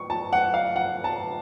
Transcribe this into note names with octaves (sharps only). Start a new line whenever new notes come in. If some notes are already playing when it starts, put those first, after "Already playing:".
Already playing: C#6
A5
F#5
F5
F#5
A5